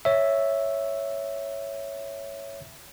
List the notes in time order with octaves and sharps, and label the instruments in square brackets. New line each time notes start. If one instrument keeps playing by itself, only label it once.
[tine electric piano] C#5 E5